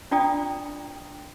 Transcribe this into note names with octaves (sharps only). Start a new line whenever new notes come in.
D4 F4 D5 G5 A#5 D#6